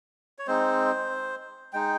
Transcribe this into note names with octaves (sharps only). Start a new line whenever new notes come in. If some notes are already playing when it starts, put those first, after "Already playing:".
C#5
G#3 C4 D#4 C5
G#3 D#4 G5